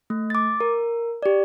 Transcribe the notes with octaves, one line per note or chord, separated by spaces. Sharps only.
A3
D6 A6
A#4
G4 D5